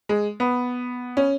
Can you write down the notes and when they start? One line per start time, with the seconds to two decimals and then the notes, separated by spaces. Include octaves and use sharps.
0.09 G#3
0.40 B3
1.17 C#4